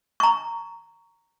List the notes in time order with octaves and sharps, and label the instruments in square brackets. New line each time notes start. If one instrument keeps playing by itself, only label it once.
[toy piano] A#5 C#6